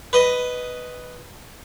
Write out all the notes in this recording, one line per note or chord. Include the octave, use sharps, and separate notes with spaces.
B4 D#5